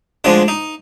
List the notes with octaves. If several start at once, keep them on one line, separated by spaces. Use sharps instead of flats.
D2 D3 F3 G#3 D4
D#4